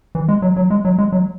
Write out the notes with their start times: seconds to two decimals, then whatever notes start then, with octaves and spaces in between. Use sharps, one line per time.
0.15 E3
0.28 G#3
0.42 F#3
0.57 F#3
0.70 G#3
0.85 F#3
0.98 G#3
1.12 F#3